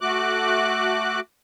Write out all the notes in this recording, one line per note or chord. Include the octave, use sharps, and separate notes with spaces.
A3 F#4 D6 F#6